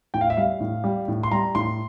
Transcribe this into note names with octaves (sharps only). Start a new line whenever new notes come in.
A2 G5
F5
E5
G3 F5
A2
G3
A2
C6
G3 A#5
A2 C6